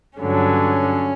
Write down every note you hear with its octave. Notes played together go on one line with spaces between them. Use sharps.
G2 D3 F#3 C#4